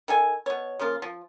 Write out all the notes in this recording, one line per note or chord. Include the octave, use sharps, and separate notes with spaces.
D#3 A4 G#5
B2 C#5
C#3 F3 A#3 F4
F3